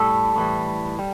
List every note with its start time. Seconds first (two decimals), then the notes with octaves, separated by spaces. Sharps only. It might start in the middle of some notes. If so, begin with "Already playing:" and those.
Already playing: A2 G3 A4
0.36 A2 E3 G3
0.99 G3